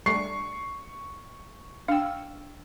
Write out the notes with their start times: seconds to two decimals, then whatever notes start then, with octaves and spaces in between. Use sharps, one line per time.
0.06 G3 A3 D4 C#6 C7
1.88 D4 F5 G5 E6